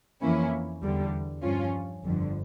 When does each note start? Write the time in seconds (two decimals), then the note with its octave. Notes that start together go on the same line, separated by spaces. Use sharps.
0.22 F2 E3 A#3 C#4 E4
0.83 E2 D3 G3
1.42 G2 F3 C#4 F4
2.03 G1 F2 D3